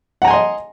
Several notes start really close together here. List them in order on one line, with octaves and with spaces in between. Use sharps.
F#5 A#5 G#5 C6 D#5